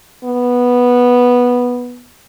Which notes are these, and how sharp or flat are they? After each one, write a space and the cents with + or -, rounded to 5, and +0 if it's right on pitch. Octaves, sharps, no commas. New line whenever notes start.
B3 -10